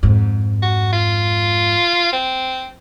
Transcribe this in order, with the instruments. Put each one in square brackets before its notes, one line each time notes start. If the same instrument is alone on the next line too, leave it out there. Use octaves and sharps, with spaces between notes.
[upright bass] F2 G#2
[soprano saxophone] F#4
F4
C4